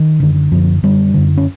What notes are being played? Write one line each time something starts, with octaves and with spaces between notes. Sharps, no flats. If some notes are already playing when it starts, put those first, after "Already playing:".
Already playing: D#3
F#2 D3
F#2 D3 F3
F#2 D3 G3
F#2 D3
C#4